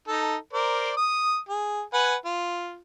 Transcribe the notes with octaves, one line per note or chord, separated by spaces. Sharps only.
D#4 A4
A#4 C5 D5
D#6
G#4
B4 F#5 G#5
F4